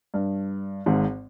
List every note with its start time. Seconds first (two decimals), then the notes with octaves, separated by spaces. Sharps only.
0.14 G2
0.86 G#1 G#2